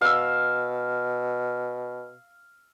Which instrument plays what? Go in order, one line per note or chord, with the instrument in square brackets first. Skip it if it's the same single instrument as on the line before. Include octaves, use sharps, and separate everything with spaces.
[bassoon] B2 [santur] F5 E6